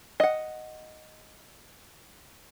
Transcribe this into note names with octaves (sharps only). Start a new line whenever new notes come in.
D#5 F#5